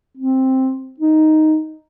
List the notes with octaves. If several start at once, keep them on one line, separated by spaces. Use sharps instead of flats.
C4
D#4